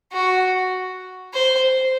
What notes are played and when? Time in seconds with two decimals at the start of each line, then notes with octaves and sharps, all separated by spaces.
0.12 F#4
1.33 C5